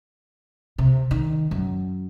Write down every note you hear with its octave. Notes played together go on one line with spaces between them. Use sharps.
C3
D#3
F#2